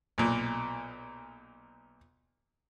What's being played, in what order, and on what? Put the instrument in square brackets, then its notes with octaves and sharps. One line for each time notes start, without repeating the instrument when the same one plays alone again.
[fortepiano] B1 A#2